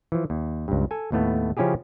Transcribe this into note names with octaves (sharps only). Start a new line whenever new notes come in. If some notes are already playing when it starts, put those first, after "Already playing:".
E3 F3
D#2
C#2 G2
A4 G#5
D#2 A2 A3 B3
C#3 F3 C#4 E4 G4 G#4